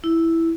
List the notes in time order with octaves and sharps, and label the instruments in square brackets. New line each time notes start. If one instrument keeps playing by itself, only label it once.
[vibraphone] E4